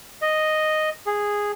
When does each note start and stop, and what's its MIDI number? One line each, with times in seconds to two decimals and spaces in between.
0.22 0.90 75
1.06 1.52 68